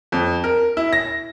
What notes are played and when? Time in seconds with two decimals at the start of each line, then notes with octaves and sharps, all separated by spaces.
0.12 F2
0.44 A#4
0.77 E4
0.93 A#6